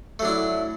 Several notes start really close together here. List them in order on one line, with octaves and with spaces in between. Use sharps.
A3 F#3 D4 E4